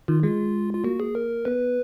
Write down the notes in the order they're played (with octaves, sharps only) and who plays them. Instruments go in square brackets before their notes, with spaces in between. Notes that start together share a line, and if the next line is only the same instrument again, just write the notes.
[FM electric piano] D#3 [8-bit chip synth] F4
[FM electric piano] G#3 [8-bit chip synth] F4
[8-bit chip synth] F4
[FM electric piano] A#3 [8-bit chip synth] F#4
[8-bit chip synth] G#4
A#4
[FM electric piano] B3 [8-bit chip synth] B4